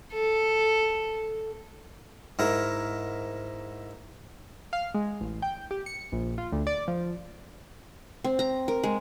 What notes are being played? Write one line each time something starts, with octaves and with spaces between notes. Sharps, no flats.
A4
G#2 E4 A#4
F5
G#3
A1
G5
G4
C#7
A#1
F4
D2
D5
F3
C4
A#5
A#4
G#3